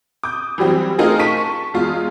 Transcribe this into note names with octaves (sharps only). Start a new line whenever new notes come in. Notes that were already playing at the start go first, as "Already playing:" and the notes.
D6 D#6 G6
E3 F#3 G3 C4
A3 C4 D#4 F4 G#4 A#4
A5 C#6 B6 D#7
E2 G#3 F4